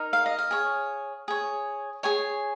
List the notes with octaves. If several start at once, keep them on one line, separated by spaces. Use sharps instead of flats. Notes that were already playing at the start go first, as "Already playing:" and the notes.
Already playing: D#4 A#4
F5
D#5
F5
G#4 C#5
G#4 C#5
G#4 C#5 G#5